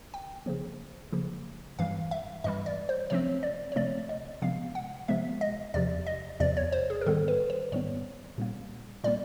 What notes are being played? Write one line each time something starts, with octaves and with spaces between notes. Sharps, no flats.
G5
C#3 F3 A#3
C#3 F3 A#3
G2 E3 G3 F5
E5
G2 E3 G3 D#5
D5
C5
C3 F3 A3 C4 C#5
D5
C#5
C3 F3 A3 C4 D5
D#5
C3 F3 G#3 B3 F5
F#5
C3 F3 G#3 B3 E5
D#5
E2 C3 F3 D5
D#5
E2 C3 F3 D5
C#5
C5
G#4
A#4
G#2 D#3 G3 B3 A4
B4
C5
G#2 D#3 G3 B3 C#5
A#2 G3 A#3
A#2 G3 A#3 D5